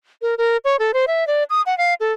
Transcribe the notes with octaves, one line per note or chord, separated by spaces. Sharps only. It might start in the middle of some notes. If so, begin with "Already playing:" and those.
A#4
A#4
C#5
A4
C5
E5
D5
D#6
F#5
F5
A4